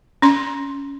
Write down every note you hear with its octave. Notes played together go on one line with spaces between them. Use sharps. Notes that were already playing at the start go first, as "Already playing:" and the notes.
C#4 C6